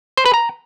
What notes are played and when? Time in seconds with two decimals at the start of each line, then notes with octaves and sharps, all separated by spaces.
0.17 C5
0.26 B4
0.34 A#5